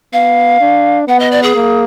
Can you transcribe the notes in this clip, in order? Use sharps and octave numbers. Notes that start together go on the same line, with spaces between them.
B3 F5
D4
B3 F#5
D#5
D5
G#4
A#3